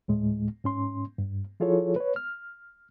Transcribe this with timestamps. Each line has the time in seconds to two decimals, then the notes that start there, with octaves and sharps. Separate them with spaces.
0.08 D2 A2 G#3
0.64 G#2 C#4 C6
1.18 G2
1.60 F3 E4 F4 G#4 A4 C#5
1.96 B4 C#5
2.16 F6